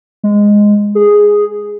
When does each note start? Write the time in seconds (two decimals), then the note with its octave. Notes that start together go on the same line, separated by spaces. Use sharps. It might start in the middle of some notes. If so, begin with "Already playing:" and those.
0.23 G#3
0.95 G#4